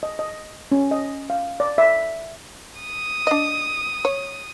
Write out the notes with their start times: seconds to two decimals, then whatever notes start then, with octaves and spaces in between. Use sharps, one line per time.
0.03 D#5
0.19 D#5
0.72 C#4
0.91 D#5
1.30 F5
1.60 D5
1.78 E5
2.81 D#6
3.27 D4 D#5
4.05 C#5